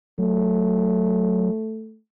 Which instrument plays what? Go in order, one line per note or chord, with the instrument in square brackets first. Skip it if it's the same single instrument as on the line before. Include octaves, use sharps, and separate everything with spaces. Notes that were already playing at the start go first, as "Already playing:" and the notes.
[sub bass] F#3 [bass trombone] A3